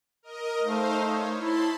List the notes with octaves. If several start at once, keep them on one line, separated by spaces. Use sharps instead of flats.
A#4 D#5
A3 D#4 C5 F5
C#5
E4 A5 B5 C6